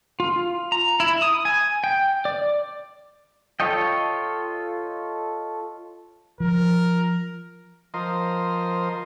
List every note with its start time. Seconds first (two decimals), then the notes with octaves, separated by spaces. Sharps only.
0.20 F4
0.72 A#5
1.00 E4
1.22 D#6
1.45 G#5
1.84 G5
2.25 D5
3.60 F4 A4 C#5 D#5 G5
6.40 F3 A#4
7.94 F3 A#4 C5 D#5